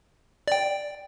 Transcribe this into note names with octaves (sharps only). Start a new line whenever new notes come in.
D5 G5